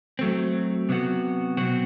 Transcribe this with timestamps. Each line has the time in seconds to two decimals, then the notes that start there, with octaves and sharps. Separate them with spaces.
0.19 F#3 A3 C4
0.89 C3 F#3 B3 F#4
1.57 B2 F#3 C4 F#4